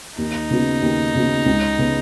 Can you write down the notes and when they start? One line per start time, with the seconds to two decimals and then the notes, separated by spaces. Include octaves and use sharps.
0.18 D#2 D#4
0.51 C#3 B3 F#4
0.82 D#2
1.15 C#3 B3 F#4
1.46 C#2
1.79 C#3 B3